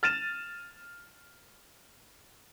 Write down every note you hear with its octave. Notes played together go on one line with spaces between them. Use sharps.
F6 A6 D#7 E7